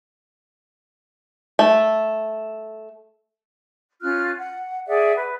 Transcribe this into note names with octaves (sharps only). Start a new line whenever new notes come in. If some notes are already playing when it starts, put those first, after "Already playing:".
A3
C#4 F4 F6 F#6
F#5
G#4 D5 E5 F#5
B4